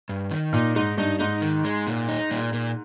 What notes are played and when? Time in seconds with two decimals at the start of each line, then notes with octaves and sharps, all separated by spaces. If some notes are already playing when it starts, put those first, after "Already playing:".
0.09 G2
0.31 D#3
0.53 A#2 D#4
0.76 G#2 D#4
0.98 G2 D#4
1.19 G#2 D#4
1.42 D#3
1.65 G#3
1.87 A#2
2.09 D#4
2.31 A#2
2.53 A#2